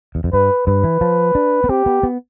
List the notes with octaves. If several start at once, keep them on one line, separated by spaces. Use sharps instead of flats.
E2
F2
G2 B4
G2 B4
E3
F3
D4
B3
C4 G4
B3
B3